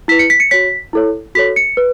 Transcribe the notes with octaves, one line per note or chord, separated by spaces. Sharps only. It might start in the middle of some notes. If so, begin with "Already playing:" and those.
E4 B4 B6
C#7
B6
C#7
F#4 C#5 B6
E4 A4 C#5
F#4 A4 C#5 B6
C#7
B4